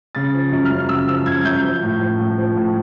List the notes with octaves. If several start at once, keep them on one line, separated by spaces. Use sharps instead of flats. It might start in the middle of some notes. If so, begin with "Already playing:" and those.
C#3 A6
F3
F#2
F6
F#2
C#3 E6
F3 E6
F#2 G#6
F#2 G6
F3
A2
F3
A2
F3
A2